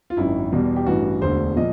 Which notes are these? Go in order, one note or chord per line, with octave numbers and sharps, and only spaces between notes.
F4
G#1 F#2 D#3 E4
E2 B2 G3
G4
A1 G2 E3 F#4
E1 D2 D3 C5
A#2 F3 D#5